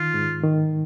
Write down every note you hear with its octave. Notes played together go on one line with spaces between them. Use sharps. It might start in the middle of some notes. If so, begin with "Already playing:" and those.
Already playing: D#3 F4
G#2
D#3